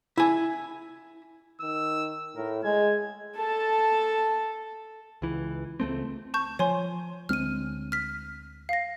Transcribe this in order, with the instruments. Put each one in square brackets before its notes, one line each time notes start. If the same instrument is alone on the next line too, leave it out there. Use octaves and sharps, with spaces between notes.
[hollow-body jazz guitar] E4 G#5
[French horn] D#3 [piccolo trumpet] E6
[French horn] A2 [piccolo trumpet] A#4
[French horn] G#3 [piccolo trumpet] G#6
[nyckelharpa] A4 A5
[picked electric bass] C#2 E3
C#2 A3 C4
[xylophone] A5 C#6 G6
[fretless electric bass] F3 [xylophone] C#5 G#5 C6
[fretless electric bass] D2 G#3 C4 [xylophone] F6 D#7
[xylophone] F6 B6
F5 A#6